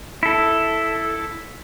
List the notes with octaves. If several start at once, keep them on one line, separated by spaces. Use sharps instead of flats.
E4 A4